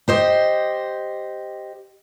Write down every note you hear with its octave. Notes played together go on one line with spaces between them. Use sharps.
G4 C5 D#5